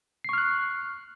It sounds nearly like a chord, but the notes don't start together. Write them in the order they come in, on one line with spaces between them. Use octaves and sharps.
C7 C#6 F6 F#6